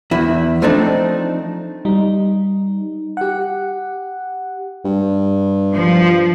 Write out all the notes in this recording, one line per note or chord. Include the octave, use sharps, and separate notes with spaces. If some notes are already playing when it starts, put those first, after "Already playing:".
E2 E4
F3 A3 C4 D4 D#4
G3 D#4
G4 F#5
G2
F3